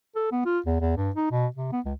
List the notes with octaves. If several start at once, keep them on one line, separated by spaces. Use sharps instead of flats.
A4
B3
F4
E2
E2
G2
D#4
B2
C3
B3
C#2